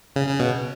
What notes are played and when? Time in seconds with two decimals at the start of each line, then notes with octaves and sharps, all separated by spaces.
0.16 C#3
0.29 C#3
0.40 B2